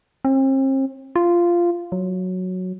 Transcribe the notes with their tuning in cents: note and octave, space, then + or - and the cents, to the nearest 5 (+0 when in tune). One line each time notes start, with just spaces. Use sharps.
C4 +40
F4 -10
F#3 -5